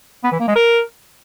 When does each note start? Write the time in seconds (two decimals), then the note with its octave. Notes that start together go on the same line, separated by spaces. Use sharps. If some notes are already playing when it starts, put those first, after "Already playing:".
0.24 B3
0.32 E3
0.40 A#3
0.48 G#3
0.55 A#4